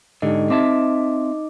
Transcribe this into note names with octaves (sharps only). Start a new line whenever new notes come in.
G#2 D3 D#4 G4 D#5
C4 D#4 D#5 E5 A5 D6